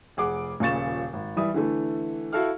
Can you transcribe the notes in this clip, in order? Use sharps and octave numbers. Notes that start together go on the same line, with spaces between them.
F1 G#4 F#5 D6
D#1 A#2 C#3 C#6 A6 E7
G#1
E3 G3 E5 D#6
D3 E3 A3
E4 F#4 A4 F5 F6